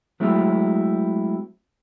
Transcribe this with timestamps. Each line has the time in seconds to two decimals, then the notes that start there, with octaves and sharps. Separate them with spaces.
0.20 F#3 G#3 A3 C4 E4